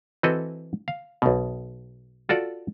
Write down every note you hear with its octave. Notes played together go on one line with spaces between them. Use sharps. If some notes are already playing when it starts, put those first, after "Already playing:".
E3 C4 F#4 A4 B4 D#5
F5
B1 B2
F4 F#4 A4 D5